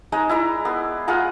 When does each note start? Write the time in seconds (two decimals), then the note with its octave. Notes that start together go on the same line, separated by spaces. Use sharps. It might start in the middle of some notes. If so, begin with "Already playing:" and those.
0.12 G#3 D#4 G#4 A#5
0.29 E4 D5 A#5
0.65 B3 C6
1.08 F4 G#4 F#5 A#5